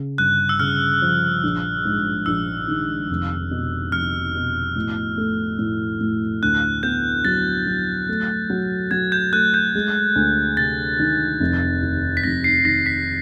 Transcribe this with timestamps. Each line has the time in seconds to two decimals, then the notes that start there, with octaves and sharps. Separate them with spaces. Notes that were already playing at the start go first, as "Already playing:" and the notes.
Already playing: C#3
0.18 G1 F#6
0.49 E6
0.60 C#3 F6
1.02 F3
1.44 A#1
1.85 G#2
2.26 A#1 E6
2.68 D#3
3.10 F1
3.51 B2
3.92 F1 F6
4.35 B2
4.76 A2
5.17 A3
5.59 A2
6.00 A2
6.42 D2 F#6
6.83 B3 G6
7.25 F#3 A6
7.66 F#3
8.09 A3
8.50 F#3
8.91 F#3 G#6
9.12 G6
9.32 A3 F#6
9.54 G6
9.75 G#3
10.16 D2
10.57 C3 A6
11.00 D#3
11.40 F1
11.82 D#2
12.17 B6
12.24 F1 A#6
12.44 C7
12.65 D#3 A#6
12.86 B6